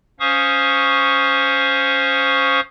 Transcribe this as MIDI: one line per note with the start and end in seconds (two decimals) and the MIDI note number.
0.20 2.60 61
0.20 2.60 72
0.20 2.60 77
0.20 2.60 85
0.20 2.60 87